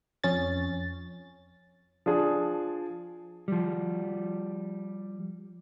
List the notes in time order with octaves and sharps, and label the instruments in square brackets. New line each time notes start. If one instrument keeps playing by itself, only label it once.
[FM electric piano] F2 C#4 A6
[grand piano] F3 D4 G#4
[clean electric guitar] F3 G3